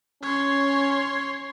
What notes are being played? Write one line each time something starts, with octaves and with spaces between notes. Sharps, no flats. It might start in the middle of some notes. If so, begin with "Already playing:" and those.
C#4 C#5 C6